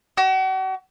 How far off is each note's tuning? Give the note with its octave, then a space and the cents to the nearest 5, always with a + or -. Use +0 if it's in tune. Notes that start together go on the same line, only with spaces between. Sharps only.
F#4 +40